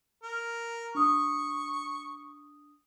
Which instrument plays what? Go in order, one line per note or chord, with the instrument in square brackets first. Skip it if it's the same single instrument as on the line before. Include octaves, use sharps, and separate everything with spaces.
[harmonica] A#4
[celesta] D4 D#6 [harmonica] C#6